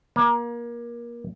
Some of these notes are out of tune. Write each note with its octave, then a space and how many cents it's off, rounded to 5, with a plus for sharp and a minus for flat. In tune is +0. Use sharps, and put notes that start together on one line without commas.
A#3 +25